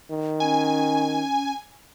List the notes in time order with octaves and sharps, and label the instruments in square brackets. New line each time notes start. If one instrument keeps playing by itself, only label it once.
[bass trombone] D#3
[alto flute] C#4 [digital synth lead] G#5